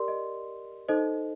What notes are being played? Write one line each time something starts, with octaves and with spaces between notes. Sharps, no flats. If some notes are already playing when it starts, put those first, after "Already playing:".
Already playing: G4 A#4 D5 C6
D#5
D#4 A4 C5 D#5